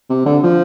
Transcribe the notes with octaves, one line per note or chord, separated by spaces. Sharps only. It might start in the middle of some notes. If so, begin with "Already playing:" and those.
C3
D3
F3